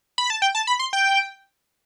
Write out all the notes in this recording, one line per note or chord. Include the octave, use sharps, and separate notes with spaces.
B5
A5
G5
A5
B5
C6
G5